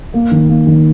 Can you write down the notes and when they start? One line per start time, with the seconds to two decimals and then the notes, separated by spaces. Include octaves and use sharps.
0.14 A#3
0.31 D#3
0.49 A#3
0.67 D#3